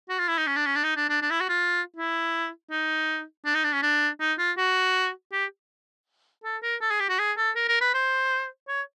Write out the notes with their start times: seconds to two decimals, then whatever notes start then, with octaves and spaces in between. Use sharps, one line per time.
0.09 F#4
0.19 F4
0.28 E4
0.38 D#4
0.47 C#4
0.56 D4
0.66 C#4
0.75 D4
0.84 D#4
0.96 D4
1.10 D4
1.22 D4
1.31 E4
1.40 F#4
1.49 F4
1.96 E4
2.71 D#4
3.45 D4
3.55 D#4
3.64 D4
3.73 C#4
3.83 D4
4.20 D#4
4.38 F4
4.58 F#4
5.32 G4
6.44 A4
6.63 A#4
6.81 A4
6.91 G#4
7.00 G4
7.09 F#4
7.19 G#4
7.37 A4
7.56 A#4
7.68 A#4
7.81 B4
7.94 C5
8.68 C#5